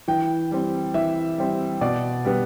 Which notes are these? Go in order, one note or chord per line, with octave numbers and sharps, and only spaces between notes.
E3 G5
G3 C4
E3 E5
G3 C4
B2 D5
G3 B3